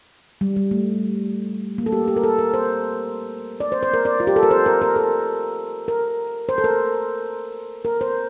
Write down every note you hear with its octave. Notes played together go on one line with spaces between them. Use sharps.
G3
G3
A3
A#3
A4
G4
G4
A#4
A4
A#4
C5
D5
C5
C5
A#4
D5
F4
G4
A4
A#4
C5
A#4
A#4
A4
A#4
C5
A4
A#4
A#4
C5